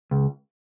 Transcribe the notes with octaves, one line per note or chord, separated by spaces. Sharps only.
C#2